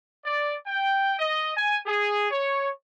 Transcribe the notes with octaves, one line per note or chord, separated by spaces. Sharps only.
D5
G5
D#5
G#5
G#4
C#5